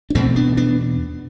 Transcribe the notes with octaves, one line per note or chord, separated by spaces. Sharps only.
D4
E2 B2 A3 C4
B3 D4
B3 D4